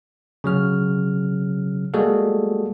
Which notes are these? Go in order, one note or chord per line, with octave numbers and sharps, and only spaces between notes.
C#3 F#3 F6
G3 G#3 A#3 F#4 G#4 A4